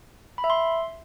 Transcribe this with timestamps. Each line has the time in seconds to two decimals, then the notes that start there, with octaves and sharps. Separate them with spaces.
0.38 B5
0.44 E5
0.50 C6